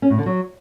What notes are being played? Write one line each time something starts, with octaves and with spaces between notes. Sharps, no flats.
C#4
A2
D3
F#3